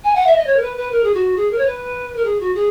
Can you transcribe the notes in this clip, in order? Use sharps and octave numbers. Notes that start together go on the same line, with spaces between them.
G#5
F#5
E5
D#5
C#5
A#4
B4
B4
A#4
G#4
F#4
G#4
A#4
C#5
B4
A#4
G#4
F#4
G#4